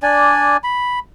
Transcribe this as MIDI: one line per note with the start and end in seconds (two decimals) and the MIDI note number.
0.03 0.57 62
0.03 0.57 74
0.03 0.57 80
0.64 0.99 83